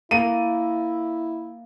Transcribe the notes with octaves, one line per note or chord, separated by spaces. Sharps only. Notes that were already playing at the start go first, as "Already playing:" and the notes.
A#3 E4 D#7